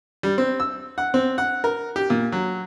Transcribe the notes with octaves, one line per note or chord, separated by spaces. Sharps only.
G3
C4
E6
F#5
C4
F#5
A#4
G4
A#2
F#3